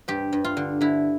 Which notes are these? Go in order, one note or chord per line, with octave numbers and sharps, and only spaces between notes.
G2 G4
G2
F4
D3
D3 E4